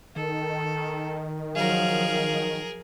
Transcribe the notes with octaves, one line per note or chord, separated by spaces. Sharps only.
D#3 A4
F3 F#3 G#4 A#4 F5